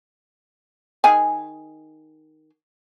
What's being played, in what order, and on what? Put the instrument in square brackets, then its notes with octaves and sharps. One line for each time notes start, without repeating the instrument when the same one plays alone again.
[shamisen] D#3 G#4 G#5